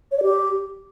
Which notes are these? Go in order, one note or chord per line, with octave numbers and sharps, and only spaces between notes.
C#5
D5
G4